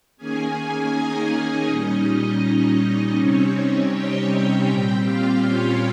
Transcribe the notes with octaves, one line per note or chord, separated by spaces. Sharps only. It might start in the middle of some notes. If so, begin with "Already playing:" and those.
D#3 A#3 C#4 G#4 G#5
D#4 D#5
A#2 G3 C#4
C3 G3 C4 C#4 D#4 C#5
G4 G5
A#2 G3 C4 G4 G5
F4 F5
C#4 C#5